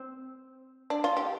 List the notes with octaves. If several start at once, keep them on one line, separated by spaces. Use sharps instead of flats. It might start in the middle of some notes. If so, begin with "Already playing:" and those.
Already playing: C4
D4
F4
G4